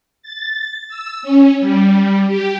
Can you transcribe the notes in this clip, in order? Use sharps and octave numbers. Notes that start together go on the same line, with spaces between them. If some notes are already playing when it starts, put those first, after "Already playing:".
A6
E6
C#4
G3
G4